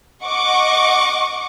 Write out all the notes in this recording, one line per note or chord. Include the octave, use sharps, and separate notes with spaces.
D#5 F#5 C#6 D6